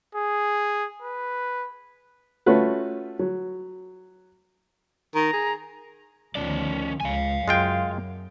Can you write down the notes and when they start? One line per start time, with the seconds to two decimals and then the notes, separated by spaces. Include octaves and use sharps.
0.15 G#4
1.02 B4
2.46 A3 C#4 F4 F#4 B4
3.19 F#3
5.15 D#3 A#5
5.33 G#4
6.35 D2 D#3 F3 C#4 D5
7.00 C#2 C#3 F5 G#5
7.48 F#2 G#3 F4 G5